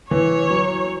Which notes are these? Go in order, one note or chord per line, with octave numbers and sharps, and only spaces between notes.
E3 C#5
F#3